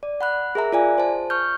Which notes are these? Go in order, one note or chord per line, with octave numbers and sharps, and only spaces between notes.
D5
F#5 B5 F#6
G#4 A#4 E5 A#5
F4 D5 G#5
C5 A5
C#6 F6 G6